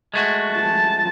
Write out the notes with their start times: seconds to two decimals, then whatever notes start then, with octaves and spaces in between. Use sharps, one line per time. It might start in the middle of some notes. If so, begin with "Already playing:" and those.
0.14 G#3 A3 F#4
0.52 A5